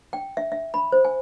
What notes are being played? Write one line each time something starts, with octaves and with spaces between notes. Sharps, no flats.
G5
E5
E5
B5
C5
G#5